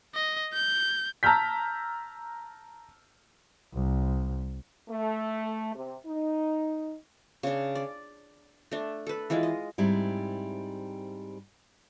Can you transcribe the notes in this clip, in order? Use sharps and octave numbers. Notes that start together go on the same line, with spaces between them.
D#5
G6
A5 A#5 E6 F6 G6 B6
C2
A3
C3
D#4
C#3 D4
D5
A3 D4
A4 B4
E3 G#3 E4 F4
D#5
G#2 G3 C4 E4